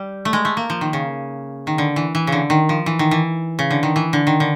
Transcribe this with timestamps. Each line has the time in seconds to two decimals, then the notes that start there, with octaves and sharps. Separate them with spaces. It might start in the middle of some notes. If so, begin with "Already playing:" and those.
Already playing: G3
0.25 A3
0.33 G#3
0.45 A3
0.57 A#3
0.70 F3
0.81 D#3
0.93 C#3
1.67 D#3
1.78 D3
1.96 E3
2.15 E3
2.27 C#3
2.32 D3
2.50 D#3
2.69 F3
2.86 E3
2.99 D#3
3.11 E3
3.59 C#3
3.71 D3
3.83 D#3
3.96 E3
4.13 D3
4.27 D#3
4.40 D3